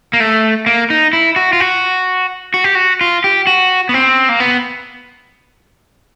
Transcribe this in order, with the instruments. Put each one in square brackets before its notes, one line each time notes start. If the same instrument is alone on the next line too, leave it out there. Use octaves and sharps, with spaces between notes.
[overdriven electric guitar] A#3
A3
A#3
D#4
E4
F#4
F4
F#4
F#4
G4
F#4
F4
G4
F#4
B3
C4
A#3
B3